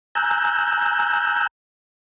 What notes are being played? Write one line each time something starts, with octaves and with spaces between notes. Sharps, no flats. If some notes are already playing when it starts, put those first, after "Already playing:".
G#5 A#5 E6 F#6 G6